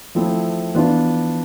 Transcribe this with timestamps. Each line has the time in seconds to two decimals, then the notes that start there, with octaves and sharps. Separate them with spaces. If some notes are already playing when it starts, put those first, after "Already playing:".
0.15 F3 A3 C4 E4
0.75 E3 B3 D4 F4